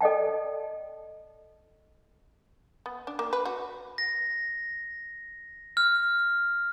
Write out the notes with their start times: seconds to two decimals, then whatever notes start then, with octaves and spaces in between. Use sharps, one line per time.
0.01 A4 D5 D#5 G5 A5
2.86 B3
3.07 D4
3.19 A#3
3.33 B4
3.46 F#4
3.98 A#6
5.77 F6